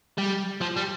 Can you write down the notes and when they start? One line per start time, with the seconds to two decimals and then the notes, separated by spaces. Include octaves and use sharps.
0.18 G3
0.61 F3
0.77 G3